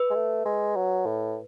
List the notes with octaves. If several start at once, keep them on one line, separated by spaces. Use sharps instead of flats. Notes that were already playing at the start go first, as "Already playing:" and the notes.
Already playing: B4
G#3
A3
G#3
F#3
A2